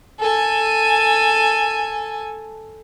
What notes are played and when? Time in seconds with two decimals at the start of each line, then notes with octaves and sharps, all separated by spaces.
0.19 A4 G#5